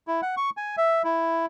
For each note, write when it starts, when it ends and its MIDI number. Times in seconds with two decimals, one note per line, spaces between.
0.07 0.21 64
0.22 0.35 78
0.37 0.50 85
0.57 0.76 80
0.77 1.02 76
1.04 1.46 64